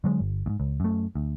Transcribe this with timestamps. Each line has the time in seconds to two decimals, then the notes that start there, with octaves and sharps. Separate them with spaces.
0.04 D3 F#3 G#3
0.20 G1
0.46 D2 G#2
0.60 C#2
0.80 F#2 A3
1.15 D2